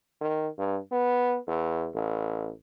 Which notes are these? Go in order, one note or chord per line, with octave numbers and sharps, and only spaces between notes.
D#3
G2
B3
E2
A1